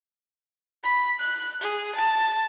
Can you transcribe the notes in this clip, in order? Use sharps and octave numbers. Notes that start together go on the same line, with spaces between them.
B5
F#6
G#4
A5